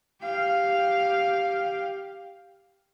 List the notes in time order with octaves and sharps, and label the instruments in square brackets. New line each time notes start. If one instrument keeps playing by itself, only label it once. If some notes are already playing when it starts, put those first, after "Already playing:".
[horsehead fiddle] G4 F5